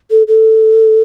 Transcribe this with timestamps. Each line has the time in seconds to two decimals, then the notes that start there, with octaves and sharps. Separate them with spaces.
0.11 A4
0.28 A4